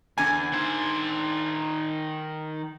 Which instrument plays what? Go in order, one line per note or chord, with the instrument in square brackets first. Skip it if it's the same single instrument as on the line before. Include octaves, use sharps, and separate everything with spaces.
[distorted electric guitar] E2 [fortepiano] D3 G#5
[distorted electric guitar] D#3 C5